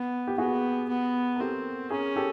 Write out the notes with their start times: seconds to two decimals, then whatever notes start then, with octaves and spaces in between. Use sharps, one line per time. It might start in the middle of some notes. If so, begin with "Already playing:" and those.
Already playing: B3
0.27 G4
0.38 B3 F#4 G#4
0.89 B3
1.36 A#4
1.40 C4 G4 A4
1.90 C#4 G#4 A#4
2.16 G4 A4